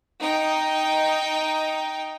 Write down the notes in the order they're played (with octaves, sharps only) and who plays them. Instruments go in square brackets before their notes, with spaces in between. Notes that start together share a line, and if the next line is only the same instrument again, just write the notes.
[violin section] D#4 G5